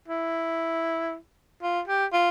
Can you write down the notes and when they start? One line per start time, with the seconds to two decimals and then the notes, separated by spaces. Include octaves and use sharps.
0.08 E4
1.62 F4
1.88 G4
2.13 F4